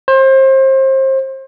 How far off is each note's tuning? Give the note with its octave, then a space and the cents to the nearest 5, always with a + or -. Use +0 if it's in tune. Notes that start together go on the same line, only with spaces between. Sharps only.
C5 +30